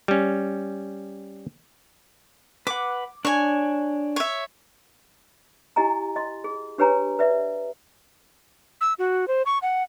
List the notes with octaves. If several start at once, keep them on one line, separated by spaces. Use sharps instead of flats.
G3 C#4
B4 F#5 D6
D4 C#5 G#5
C#5 E5
E4 G4 D#5 G#5 A#5
D#5 C6
G#4
D4 G4 B4 C#5 G#5 A#5
B4 D5 E5
E6
F#4
C5
C#6
F#5